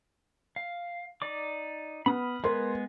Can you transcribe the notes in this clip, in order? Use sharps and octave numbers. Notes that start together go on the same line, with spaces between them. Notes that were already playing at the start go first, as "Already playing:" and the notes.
F5
D#4 D5 D6
B3 B5 D#6 F6
G#3 B3 A#4 B4 C6